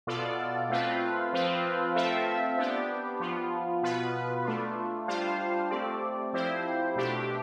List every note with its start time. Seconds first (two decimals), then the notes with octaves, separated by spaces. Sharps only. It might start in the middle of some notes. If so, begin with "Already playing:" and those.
0.07 B2 B3 F4 A4 D5
0.70 A3 C4 F4 B4
1.33 F3 C4 F4 B4
1.95 A3 C4 F4 A4 E5
2.58 B3 D4 G4
3.20 F3 B3 F4
3.82 B2 B3 F4 B4
4.45 A3 D4 F4
5.08 G3 D4 F4 C5 F5
5.70 A3 C4 G4 D5
6.33 F3 C4 E4 G4 C5
6.96 B2 A3 D4 G4